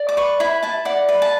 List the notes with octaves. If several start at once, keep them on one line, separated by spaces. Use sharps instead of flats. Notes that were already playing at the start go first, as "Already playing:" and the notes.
Already playing: D5
D6
B4 C#6
E4 B5
E4 A5
D5 F#5
B4
A5